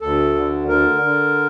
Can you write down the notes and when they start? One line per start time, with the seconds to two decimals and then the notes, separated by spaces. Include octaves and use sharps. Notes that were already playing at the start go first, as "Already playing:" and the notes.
0.01 D2 A4
0.35 D3
0.68 D3 A#4
1.02 D3